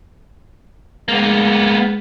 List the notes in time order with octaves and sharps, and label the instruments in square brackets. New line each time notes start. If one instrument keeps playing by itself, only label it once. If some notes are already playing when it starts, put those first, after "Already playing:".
[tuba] G#3 [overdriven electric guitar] A#3 B3